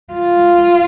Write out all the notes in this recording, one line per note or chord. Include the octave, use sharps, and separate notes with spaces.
F4